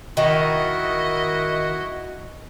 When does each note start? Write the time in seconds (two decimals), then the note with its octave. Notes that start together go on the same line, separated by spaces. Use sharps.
0.17 D#3 E4 F#4 D#5